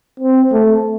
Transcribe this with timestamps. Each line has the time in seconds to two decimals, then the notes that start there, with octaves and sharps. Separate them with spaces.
0.20 C4
0.52 A3